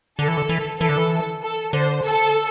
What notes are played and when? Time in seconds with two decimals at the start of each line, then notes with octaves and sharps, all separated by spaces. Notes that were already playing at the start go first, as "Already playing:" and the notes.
0.19 D3 A4
0.28 E3
0.37 D3
0.49 E3
0.80 E3 A4
0.89 D3
0.97 E3
1.42 A4
1.73 D3 C5
2.05 A4